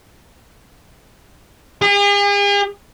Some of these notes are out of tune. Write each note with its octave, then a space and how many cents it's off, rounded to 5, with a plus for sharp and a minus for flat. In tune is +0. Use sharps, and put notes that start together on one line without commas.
G#4 -45